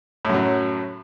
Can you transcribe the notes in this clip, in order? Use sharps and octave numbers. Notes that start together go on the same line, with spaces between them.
F#2 A2 F#3